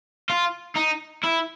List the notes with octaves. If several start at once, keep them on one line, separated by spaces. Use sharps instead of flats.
F4
D#4
E4